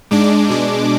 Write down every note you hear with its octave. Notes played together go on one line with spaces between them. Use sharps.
G#2 G#3 D4 D6
B2 G#3 D4